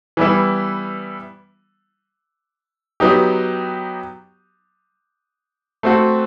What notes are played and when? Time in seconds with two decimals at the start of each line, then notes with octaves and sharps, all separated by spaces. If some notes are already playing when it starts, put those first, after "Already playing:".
0.17 E3 G3 B3 E4
3.00 F#3 B3 D#4 G4
5.83 A3 C4 F#4